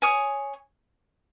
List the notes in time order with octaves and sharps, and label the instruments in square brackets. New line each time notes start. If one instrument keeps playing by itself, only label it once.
[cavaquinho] C#5 G#5 D#6